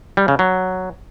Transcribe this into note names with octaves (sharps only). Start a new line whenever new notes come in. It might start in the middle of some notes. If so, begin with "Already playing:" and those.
G3
C#3
F#3